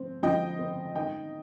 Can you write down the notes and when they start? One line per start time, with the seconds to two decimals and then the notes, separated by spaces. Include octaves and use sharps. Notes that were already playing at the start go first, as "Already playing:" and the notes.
Already playing: F3 C4
0.23 F3 D#5 G5
0.59 C4
0.95 D#3 D#5 G5